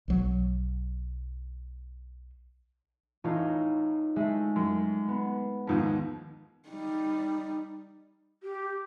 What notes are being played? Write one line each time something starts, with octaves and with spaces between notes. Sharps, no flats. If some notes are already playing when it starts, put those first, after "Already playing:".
B1 F#3
E2 A2 C#4 D#4 F4
G#3 A3 E4
F#2
B3
D#2 G#2 F3
G3 D#4
G4